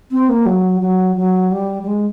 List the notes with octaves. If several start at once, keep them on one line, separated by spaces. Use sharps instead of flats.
C4
A#3
F#3
F#3
F#3
G3
G3
G#3